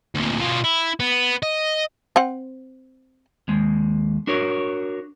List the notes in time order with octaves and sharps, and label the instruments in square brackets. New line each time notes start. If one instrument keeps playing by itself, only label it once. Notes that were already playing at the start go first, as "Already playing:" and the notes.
[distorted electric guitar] D2 A#2
B2 F4
E4
B3
D#5
[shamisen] C4 C5 F#5
[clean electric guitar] D#2 G#3
D4 F#4 A#4 C#5